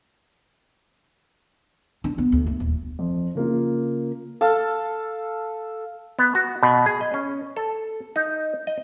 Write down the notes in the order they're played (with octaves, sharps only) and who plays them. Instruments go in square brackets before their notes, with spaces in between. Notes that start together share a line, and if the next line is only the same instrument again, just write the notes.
[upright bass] D4
B3
D2
A3
D#1
[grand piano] F2
C#3 A#3 F4
[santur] A4 F5
[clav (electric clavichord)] B3
F#4
B2
G#4
D#5
C#4
A4
D#4
D#5